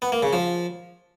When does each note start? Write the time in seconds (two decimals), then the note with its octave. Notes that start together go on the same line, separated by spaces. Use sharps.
0.02 B3
0.12 A#3
0.23 C#3
0.33 F3